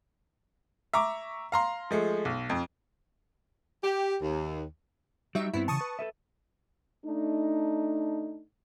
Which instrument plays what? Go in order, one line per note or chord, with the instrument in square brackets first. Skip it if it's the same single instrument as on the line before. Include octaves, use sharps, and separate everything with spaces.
[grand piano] E5 A#5 C#6 D6
F5 A#5 C6
F3 G#3 A3
B1
F2
[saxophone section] G4
D#2
[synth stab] F#3 D#4 E5 [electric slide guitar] G3
[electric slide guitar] G2 B3 C4 [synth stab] E4
[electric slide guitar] C#3 E3 [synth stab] A5 C#6 D#6
[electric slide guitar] B4
A4 B4 E5
[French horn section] A3 D4 D#4